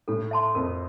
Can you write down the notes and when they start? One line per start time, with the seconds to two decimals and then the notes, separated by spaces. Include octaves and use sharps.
0.08 A2 A4
0.31 E5 A5 C6
0.55 F2 A#4